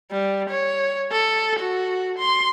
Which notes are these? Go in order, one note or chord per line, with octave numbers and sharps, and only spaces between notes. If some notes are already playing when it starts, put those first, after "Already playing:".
G3
C#5
A4
F#4
C6